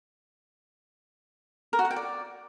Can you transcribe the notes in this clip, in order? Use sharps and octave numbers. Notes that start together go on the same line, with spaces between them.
A#4
F#4
F#5
G5
D5